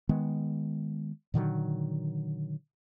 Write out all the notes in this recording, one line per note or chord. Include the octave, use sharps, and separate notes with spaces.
D#3 G#3 B3
A#2 D3 D#3 F#3